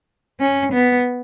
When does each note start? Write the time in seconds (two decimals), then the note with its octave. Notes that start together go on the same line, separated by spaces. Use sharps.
0.40 C#4
0.73 B3